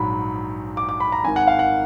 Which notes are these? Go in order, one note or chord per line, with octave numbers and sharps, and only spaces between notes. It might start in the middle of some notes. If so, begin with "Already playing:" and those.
Already playing: A#1 G#2 F#3 B5
D6
D6
B5
A#5
G#1 G#2 D#3 G#5
F#5
F5
F#5